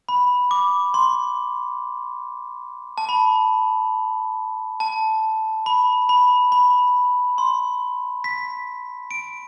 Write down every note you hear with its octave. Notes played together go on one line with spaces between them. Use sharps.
B5
D6
C6
A5
B5
A5
B5
B5
B5
C6
B6
D7